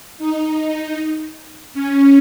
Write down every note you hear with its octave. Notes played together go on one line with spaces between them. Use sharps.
D#4
D#4
C#4